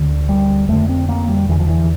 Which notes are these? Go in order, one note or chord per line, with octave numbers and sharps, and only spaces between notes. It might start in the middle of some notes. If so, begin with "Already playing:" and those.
Already playing: D2 D3
G3
F2 D3 A3
C4
A#3
G3
E2 D3 E3
F3
E3